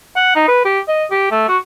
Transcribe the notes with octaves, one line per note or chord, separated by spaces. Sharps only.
F#5
D#4
B4
G4
D#5
G4
A3
F#4